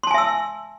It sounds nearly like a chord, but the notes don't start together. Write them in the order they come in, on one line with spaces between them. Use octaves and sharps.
C6 A5 G#5 E5 E6